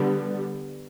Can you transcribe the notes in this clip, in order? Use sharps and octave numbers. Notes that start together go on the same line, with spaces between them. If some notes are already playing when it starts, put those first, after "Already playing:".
Already playing: D3 G3 B3